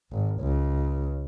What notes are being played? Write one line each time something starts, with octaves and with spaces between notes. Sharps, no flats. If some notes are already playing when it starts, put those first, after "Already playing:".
G#1
C#2